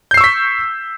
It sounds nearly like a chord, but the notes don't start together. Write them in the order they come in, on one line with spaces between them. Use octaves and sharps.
G6 C7 E6 C#6 B6